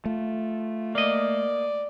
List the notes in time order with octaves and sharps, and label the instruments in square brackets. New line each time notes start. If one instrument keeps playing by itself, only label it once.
[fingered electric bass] A3 [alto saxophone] F4
[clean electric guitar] A#3 D#5 [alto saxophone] D5